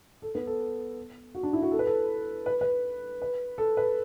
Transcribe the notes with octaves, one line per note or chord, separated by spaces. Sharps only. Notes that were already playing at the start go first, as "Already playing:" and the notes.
A4
B3
A4
F#4
D4
E4
F#4
A4
B4
A4
B4
B4
B4
A4
B4